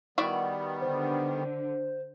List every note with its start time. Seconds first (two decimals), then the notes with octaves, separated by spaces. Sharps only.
0.18 D#3 G3 B3 E4 F#4 D5
0.81 D3 C5